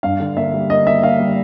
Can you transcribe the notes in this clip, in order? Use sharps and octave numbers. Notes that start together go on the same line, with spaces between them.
G2 F5
D3
A#3 E5
G3
A#3 D#5
A#3 E5
A#3 F5
G3